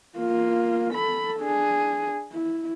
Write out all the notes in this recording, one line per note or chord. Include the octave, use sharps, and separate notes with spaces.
A#3 F4
A4 B5
D4 G#4
E4